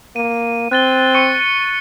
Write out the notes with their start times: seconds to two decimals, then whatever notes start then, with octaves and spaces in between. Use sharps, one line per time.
0.16 A#3 D#7
0.71 C4 F#6 A6 G7
1.14 C#6 C#7 D#7